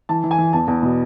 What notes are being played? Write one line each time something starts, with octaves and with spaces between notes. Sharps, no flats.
E3 A5
E3
G#5
E3
E2 A5
E2
B2